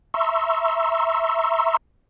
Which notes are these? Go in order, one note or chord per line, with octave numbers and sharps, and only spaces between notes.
E5 A#5 C6 C#6 E6